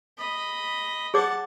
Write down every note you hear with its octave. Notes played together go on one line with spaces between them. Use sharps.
D#5 B5
G#4 C#5 F#5 A5 D6